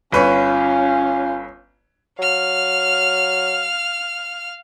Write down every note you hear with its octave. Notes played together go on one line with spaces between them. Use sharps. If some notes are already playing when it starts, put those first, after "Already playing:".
G1 C#4 F4 B4 C#5
F#3 F5 F6